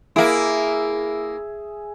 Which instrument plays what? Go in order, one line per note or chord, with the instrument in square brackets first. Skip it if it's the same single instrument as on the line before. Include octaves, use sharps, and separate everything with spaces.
[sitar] A#3 E4 [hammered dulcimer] G#4 E5